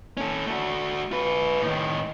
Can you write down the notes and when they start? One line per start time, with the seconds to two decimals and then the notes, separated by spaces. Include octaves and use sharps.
0.17 C#4 A4
0.47 A3 F#4
1.12 F4 B4
1.62 A2 D#3